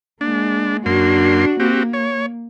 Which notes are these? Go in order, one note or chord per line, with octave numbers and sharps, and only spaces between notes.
G#3 A#3 D4
F#2 A#3 D4 F#4 C6
A#3 C4 F#4 G4
C#5